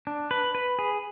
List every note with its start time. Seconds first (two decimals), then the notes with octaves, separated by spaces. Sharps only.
0.07 D4
0.31 B4
0.55 B4
0.79 G#4